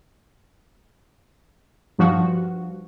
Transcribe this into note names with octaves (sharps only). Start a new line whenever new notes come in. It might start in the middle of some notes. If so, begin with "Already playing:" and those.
G2 F3 F#4